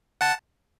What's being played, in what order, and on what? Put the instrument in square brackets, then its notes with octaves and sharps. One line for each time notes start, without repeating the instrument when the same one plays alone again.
[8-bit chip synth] F#5 A5